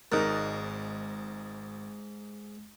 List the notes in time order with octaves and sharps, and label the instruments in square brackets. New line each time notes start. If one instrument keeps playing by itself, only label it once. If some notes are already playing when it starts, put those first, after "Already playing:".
[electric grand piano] G#1 F#6 A6 [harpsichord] G#2 [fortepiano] D#4 A#4